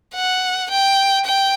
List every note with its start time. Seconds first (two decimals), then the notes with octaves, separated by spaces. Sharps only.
0.15 F#5
0.70 G5
1.25 G5